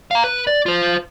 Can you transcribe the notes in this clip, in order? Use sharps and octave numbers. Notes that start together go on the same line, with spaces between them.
F5 A#5
B4
D5
F4 C5